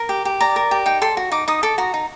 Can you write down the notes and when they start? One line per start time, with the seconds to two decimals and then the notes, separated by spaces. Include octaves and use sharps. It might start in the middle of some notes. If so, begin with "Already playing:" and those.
Already playing: A#4
0.09 G4
0.25 G4
0.41 D5 A#5
0.56 A#4
0.71 G4
0.86 D#4 G5
1.02 A4 C6
1.17 F#4
1.32 D#4 D6
1.48 D#4 D#6
1.63 A4 D6
1.78 F#4 A#5
1.94 D#4